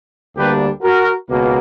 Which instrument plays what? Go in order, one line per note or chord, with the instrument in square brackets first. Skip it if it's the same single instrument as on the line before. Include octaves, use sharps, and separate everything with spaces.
[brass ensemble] D2 D3 G3 A#3 D4 G4 B4
F#4 A#4
C#2 B2 A#3